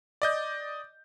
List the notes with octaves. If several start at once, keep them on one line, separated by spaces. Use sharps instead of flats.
D5 D#5 G6